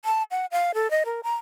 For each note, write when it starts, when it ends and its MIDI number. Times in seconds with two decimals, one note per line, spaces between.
0.05 0.23 81
0.31 0.46 78
0.52 0.72 77
0.74 0.90 69
0.91 1.03 75
1.05 1.21 70
1.23 1.35 82